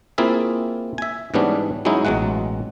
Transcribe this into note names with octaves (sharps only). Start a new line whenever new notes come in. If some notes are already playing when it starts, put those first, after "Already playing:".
A#3 C4 E4 F4 G#4 E5
E5 G#5
G#2 E3 G3 B3 C#4 D4
F#3 G#3 C#4 D#4 E4
A1 B2 F#3 G#3 F#5